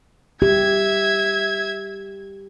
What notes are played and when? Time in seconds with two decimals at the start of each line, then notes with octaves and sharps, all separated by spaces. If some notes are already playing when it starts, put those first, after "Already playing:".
0.42 G4 E5 G#6